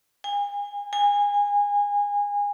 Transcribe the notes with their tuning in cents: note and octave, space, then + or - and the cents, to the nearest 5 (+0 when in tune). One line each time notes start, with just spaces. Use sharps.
G#5 -40
G#5 -25